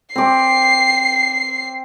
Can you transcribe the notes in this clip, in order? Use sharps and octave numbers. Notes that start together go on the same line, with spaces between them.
C4 D6 C7